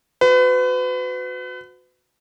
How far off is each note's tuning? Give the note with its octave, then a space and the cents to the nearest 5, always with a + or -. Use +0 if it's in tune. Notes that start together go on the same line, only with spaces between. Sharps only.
F#4 -20 B4 +35